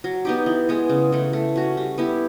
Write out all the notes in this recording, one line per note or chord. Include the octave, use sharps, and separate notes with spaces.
F#3
B3 D#4 G4
E3
G#3 B3
C#3
E3 A3
A3
C#4 F#4
G3
B3 E4 G4